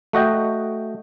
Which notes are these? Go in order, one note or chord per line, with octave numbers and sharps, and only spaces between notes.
A3 F#4 D#5 G5